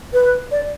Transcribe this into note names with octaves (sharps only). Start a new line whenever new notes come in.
B4
D5